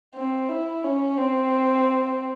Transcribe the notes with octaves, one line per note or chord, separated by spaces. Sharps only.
C4
E4
C#4
C4